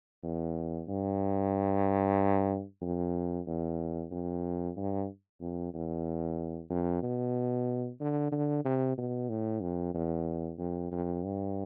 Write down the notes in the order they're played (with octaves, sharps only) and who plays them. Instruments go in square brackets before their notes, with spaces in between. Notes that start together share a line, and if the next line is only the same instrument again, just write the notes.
[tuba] E2
G2
F2
E2
F2
G2
F2
E2
F2
B2
D3
D3
C3
B2
A2
F2
E2
F2
F2
G2